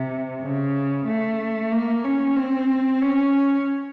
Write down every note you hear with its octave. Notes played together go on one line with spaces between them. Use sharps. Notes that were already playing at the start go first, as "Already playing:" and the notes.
Already playing: C3
C#3
A3
A#3
C#4
C4
C#4